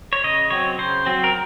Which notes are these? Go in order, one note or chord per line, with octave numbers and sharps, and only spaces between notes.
C#5
C#3 D#5
F#3 C4 C#5
C#3 C5
F#3 C4
A#4